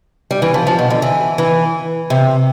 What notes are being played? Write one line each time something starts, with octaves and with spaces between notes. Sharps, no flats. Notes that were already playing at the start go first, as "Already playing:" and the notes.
G3
E3
F3
F3
B2
D3
E3
E3
C3